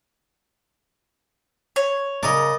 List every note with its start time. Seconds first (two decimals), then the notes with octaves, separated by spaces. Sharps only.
1.76 C#5
2.23 C#3 A#4 D5 D#5